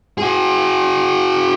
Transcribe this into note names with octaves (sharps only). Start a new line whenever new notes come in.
F#4 G#4